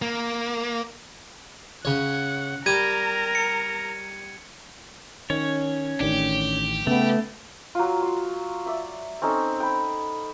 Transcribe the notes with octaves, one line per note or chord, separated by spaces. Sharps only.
A#3
C#3 C#5 F#5
G3 A#4 A#5 G#6 D#7
C#7
D#3 C#4 C#5
A1 D#3 D4 G4
C#3 A3 B3
F#3 F4
C6
D5 E5
C4 C#4 D#4 A4
G5 B5